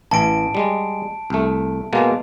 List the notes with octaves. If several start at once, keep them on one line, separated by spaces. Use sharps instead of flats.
A1 E3 A5 D7
G3 G#3
C2 A3
B2 G#3 A#3